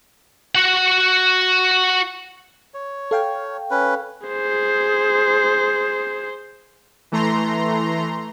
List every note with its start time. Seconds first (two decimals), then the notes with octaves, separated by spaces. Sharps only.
0.55 F#4 F#5
2.74 C#5
3.11 A4 F5 G5
3.71 C#4 B4
4.27 G#4 C5
7.12 E3 A3 A#5 C6